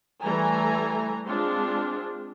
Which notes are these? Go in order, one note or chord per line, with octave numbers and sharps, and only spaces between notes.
E3 G3 A3 A4 G#5 A#5
G#3 C4 D4 F4